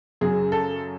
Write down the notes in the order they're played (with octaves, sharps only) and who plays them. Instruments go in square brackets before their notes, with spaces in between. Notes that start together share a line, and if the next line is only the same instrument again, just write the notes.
[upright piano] F#2 C#3 F#3 G#4
A4